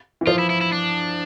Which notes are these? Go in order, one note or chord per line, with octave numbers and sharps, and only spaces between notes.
E3
F3 F4
E4
E4
E4
D4